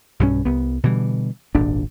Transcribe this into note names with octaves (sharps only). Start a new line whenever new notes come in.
B1 G2 F3 C#4
C2 B3
B2 D3 E3 G3
D#1 G#1 A#2 D4